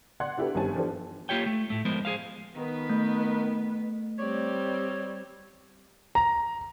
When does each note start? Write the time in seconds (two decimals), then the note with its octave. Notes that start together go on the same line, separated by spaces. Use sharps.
0.20 D5 F#5 C6 F#6 G#6
0.37 D4 E4 F#4 G4 A4 B4
0.55 G1 D#3 G3 C4 G#5 A5
0.75 E3 F3 D4 G4 A4 C5
1.29 A#3 F4 G4 C#5 G5
1.46 A3
1.70 A2 A3
1.85 F3 G#3 B3 A#4 C5
2.05 G#4 C5 F5
2.56 D#3 B3 B4
2.89 A3
4.19 G3 C4 C#5 D5
6.15 A#5